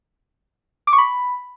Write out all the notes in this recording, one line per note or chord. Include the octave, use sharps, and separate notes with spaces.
D6
C#6
B5